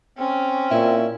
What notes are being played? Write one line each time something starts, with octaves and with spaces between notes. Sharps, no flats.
C4 C#4
A#2 E4